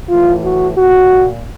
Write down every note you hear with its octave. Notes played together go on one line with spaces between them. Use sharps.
A2 E3 F4
F#4
A#2 F#4